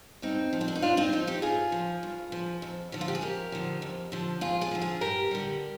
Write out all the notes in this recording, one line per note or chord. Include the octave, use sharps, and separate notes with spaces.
G2 C4 D#4
F3
C4
D4
D#4
G2 D4 F4
C4 D#4
F3 C4 D#4
D#4 G4
G2 F4 G#4
F3
G2
F3
F2
D3 F3
F4
G4
G#4
F2 G4 A#4
D3 F3
F2
D3 F3
F2 F4 G#4
F4 G#4
D3 F3
F4 G#4
G2 G4 A#4
D3 G3